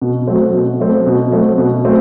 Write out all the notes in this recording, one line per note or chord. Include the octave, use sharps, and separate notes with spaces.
B2
F#3 A3 C4
B2
F#3 A3 C4
B2
F#3 A3 C4
B2
F#3 A3 C4